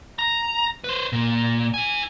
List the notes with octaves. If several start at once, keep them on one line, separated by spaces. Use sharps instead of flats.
A#5
B4 C5
A#2
E4 G#5